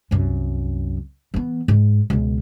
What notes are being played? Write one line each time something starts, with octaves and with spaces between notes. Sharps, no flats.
C2 F#2
E3 B3
G#2
C#2 B2